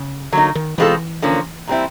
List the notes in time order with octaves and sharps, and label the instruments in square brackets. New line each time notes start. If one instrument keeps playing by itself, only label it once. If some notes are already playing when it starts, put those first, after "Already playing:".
Already playing: [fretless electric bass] C#3
[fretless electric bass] D3 [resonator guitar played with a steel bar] F#3 A#3 D#4
[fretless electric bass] D#3
[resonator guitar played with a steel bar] B2 G#3 C4 F4 A4 [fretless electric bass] E3
[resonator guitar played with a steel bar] D3 F3 A#3 C#4
A#2 G3 C4 E4